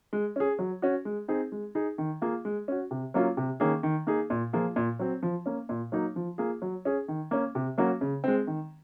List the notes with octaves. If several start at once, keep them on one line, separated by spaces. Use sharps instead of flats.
G#3
C#4 G#4
F#3
C#4 F#4
G#3
C4 D#4 G#4
G#3
D#4 G#4
D#3
A#3 F4 G#4
G#3
C#4 F#4
C3
F#3 A#3 C#4 F4
C3
D#3 A#3 C#4 G#4
D#3
A#3 D#4 G#4
A#2
F3 A#3 F4 G#4
A#2
F#3 C4
F3
A#3 C#4
A#2
F#3 A#3 D#4
F3
A#3 F4 G#4
F#3
C#4 G#4
D#3
A#3 C#4
C3
F#3 A#3 C#4 F#4
C#3
G#3 C4
D#3